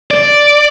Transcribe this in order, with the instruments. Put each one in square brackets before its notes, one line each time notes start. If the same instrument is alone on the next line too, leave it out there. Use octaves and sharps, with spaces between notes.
[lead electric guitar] D5